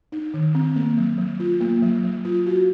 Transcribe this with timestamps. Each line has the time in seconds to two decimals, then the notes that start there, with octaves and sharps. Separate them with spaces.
0.12 D#4
0.34 D#3
0.55 C4
0.76 A#3
0.97 F#3
1.18 F#3
1.40 F4
1.61 A#3
1.82 F#3
2.04 F#3
2.25 F4
2.46 F#4